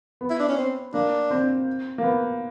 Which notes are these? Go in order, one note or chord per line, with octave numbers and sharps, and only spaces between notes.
B3
E4
D4
C#4
C4
A#3 D4
C4
A#3
B3